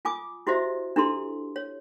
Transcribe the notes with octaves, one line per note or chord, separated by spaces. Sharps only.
F4 G#5 D6 D#6
E4 F#4 G4 C5 D#5 E5
D4 E4 G4 A4 C6
C#5